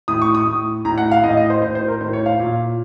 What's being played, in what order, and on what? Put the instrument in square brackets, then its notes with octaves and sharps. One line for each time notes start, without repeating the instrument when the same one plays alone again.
[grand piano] A2 D#6
C#6
D#6
A2
A2 A#5
F#5
F5
A2 D#5
D#5
C5
A2 C5
C5
A#4
A2 C5
C#5
F5
A#2